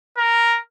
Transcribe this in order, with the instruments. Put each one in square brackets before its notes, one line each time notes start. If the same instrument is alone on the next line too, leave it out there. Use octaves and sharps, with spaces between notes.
[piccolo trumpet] A#4